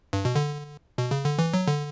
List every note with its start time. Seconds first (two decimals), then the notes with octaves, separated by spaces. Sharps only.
0.13 G2
0.25 B2
0.35 D3
0.98 B2
1.11 C#3
1.24 D3
1.39 E3
1.54 F#3
1.67 D3